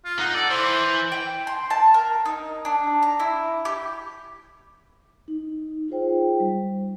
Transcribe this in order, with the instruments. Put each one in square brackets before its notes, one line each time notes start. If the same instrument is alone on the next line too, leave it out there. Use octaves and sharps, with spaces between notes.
[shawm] F4
[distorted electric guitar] D#4 [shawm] F#5
[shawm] A4 [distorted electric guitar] D5
[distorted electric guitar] E3 [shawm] C5
[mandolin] G5
C6
A5
A#4
D#4
D4
A#5
E4
G4
[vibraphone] D#4
D#4 F4 G#4 C5 G5
G3